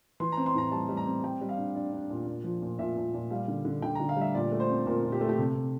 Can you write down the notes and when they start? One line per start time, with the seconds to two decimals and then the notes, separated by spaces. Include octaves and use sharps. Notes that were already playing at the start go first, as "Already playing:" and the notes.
0.20 E3 C6
0.32 A#5
0.37 C4
0.46 C6
0.54 A2 A#5
0.72 G3 A5
0.89 G3
0.97 A#5
1.06 C4
1.23 G3 G5
1.41 G3
1.49 F5
1.57 D4
1.75 D4 D5
1.93 D4
2.10 A#2
2.27 A#2
2.44 F3
2.62 A#2
2.79 A#2 E5
2.96 A#2
3.14 A#2
3.31 G3 F5
3.48 D3
3.65 D3
3.82 D3 G5
3.95 D3 A#5
4.09 F5
4.17 G3 E5
4.34 A#2 D5
4.52 A3
4.60 C5
4.70 C4
4.86 A#2 A#4
5.03 A#2
5.12 G4
5.20 A3 A4
5.29 G4
5.38 C3 A4
5.55 C3